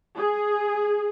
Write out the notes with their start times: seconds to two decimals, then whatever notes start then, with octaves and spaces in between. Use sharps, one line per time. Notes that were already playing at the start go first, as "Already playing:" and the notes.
0.17 G#4